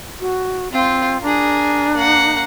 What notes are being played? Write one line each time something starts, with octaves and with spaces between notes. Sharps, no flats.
F#4
C4 F4
D4 G#4 A#4
A#3 F#5